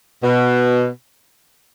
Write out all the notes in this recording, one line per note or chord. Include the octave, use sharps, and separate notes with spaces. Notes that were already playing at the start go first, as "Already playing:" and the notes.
B2